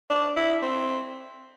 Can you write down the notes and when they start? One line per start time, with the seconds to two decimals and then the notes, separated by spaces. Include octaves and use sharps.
0.10 D4
0.36 E4
0.62 C4